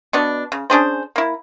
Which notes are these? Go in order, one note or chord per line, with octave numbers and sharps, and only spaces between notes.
B2 B3 D4
C#3
C#4 D4 G#4 C5
A#3 E4